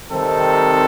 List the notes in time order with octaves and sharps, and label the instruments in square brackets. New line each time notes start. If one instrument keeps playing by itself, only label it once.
[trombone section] C3 D#3 G3 C4 D#4 [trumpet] A4